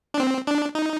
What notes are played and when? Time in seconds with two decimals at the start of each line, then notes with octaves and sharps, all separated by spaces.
0.14 D4
0.20 C4
0.47 D4
0.75 D#4